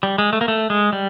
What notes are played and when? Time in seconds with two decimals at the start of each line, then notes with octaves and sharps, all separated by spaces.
0.03 G3
0.18 G#3
0.33 A3
0.41 A#3
0.48 A3
0.70 G#3
0.93 G3